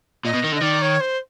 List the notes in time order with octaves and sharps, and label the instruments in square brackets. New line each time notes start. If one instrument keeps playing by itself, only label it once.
[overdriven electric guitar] A#2 [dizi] D#5
[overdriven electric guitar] B2
D#3
D3
[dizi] D#5
[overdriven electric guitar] D#3 [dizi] D5
[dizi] C#5
C5